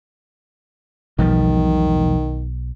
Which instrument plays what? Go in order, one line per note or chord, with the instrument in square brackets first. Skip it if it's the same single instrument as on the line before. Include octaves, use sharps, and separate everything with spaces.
[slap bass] E1 F3 G3 [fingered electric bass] B1 [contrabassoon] D#3